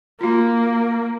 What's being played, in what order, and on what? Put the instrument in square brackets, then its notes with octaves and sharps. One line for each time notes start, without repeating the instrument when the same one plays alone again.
[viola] A#3 [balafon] F4 F#4